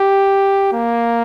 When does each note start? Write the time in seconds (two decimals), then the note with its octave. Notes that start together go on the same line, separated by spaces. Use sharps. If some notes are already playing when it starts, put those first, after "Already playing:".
Already playing: G4
0.72 A#3